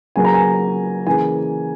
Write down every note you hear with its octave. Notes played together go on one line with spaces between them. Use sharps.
C#3 F#3 A#3 G#5
A#5
G#5
C#3 E3 A#3 G#5